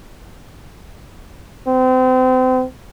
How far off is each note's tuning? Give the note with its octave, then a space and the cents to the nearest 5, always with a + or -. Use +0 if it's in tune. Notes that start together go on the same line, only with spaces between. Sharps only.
C4 -35